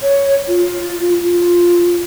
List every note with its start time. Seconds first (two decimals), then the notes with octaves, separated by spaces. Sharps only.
0.02 C#5
0.48 F4
1.22 F4